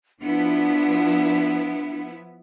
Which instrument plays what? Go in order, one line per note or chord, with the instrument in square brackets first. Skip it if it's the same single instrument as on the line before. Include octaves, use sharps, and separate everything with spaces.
[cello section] F3 B3 E4 [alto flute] D4